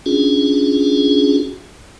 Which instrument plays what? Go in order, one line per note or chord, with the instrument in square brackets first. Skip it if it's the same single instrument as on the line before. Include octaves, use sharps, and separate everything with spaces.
[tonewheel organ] C#4 D4 F4 F#4 G#4